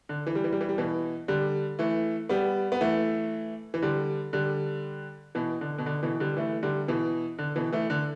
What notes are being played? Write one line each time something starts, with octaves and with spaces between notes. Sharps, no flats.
D3
E3
G3
E3
G3
E3
G3
B2 E3
D3 G3
E3 A3
G3 B3
B3
E3 A3
E3
D3 G3
D3 G3
B2 E3
D3
B2
D3
B2 E3
D3 G3
E3 A3
D3 G3
B2 E3
D3
B2 E3
E3 A3
D3